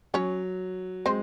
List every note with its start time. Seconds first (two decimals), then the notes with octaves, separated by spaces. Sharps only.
0.14 F#3 C#4 C#5
1.06 G#3 C4 C5